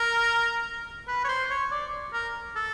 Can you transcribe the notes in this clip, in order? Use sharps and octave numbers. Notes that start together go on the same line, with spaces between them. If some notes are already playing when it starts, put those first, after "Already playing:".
Already playing: A#4
B4
C#5
C5
C#5
D5
A#4
A4